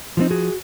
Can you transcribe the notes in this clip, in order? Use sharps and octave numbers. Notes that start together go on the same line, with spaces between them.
F3 G#3 C4 D#4
F#4 G#4